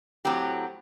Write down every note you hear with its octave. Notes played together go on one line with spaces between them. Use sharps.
A2 F#3 C4 G4